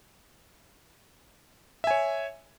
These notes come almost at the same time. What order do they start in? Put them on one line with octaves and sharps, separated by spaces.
E5 G#5 C#5